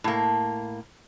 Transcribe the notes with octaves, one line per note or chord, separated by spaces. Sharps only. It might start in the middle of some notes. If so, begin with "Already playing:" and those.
A2 A#3